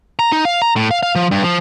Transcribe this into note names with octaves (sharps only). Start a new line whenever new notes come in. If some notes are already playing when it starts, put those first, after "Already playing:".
A#5
D#4
F5
A#5
A2
F5
F5
F3
G2
F3